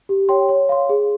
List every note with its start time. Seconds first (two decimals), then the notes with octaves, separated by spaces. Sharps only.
0.09 G4
0.29 C#5 G5 C6
0.49 C#5
0.69 F5 C6
0.89 G#4